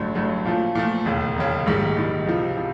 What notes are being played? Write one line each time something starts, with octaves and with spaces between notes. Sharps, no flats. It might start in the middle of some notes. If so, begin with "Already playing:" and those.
Already playing: A1 G2 D3 F#3 A3
A1 G2 D3 F#3 A3
A#2 F3 A3
A#2 F3 A3
E1 D#2 C#3
E1 D#2 C#3
A#1 G#2 D#3 G3
A#1 G#2 D#3 G3
C#2 C3 F3
C3 F3